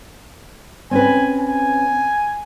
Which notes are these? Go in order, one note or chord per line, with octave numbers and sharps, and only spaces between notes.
C4 C#4 B4 G#5
G#5